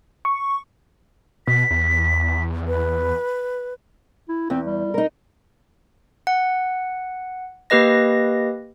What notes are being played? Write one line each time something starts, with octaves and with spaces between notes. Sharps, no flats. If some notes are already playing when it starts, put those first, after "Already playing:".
C#6
B2 B6
E2
B4
E4
E2 C4
G3
D#4 A#4
F#5
A#3 G4 B4 D#5 A#6